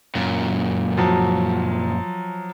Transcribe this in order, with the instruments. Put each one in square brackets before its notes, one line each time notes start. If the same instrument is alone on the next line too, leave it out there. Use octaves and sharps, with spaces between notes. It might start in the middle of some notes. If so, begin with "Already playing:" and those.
[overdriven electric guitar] F#2 A#2
[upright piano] F3 F#3